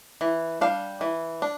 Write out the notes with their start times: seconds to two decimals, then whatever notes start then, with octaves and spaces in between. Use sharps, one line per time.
0.21 E3
0.61 G3 D4 F5
1.01 E3
1.42 D4